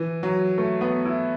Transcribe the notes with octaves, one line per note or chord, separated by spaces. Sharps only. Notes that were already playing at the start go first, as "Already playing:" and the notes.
Already playing: E3
F#3
A3
B3
E4